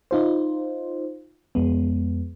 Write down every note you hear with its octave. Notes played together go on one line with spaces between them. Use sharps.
D#4 F4 C5
F2 G#3 B3